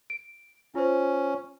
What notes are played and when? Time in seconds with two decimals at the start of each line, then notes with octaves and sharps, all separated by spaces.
0.10 D7
0.75 C#4 F4 C5